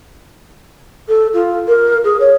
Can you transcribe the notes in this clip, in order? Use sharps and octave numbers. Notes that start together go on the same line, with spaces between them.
A4
F4
A#4
G#4
C#5